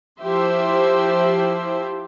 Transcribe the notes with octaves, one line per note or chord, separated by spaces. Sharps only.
F3 E4 G4 C5 E5 C6